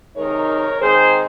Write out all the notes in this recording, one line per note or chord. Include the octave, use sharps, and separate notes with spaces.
C3 D#3 G#3 D#4 A#4 C#5
D#3 G#3 C4 D#4 G#4 C5